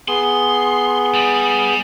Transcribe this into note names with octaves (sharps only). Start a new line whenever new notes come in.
B3 G#4 C6
G3